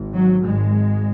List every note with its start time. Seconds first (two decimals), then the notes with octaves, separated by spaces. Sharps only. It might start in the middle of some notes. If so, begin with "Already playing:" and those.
Already playing: G#1 G#2
0.13 F#3
0.44 G#1 G#2 G#3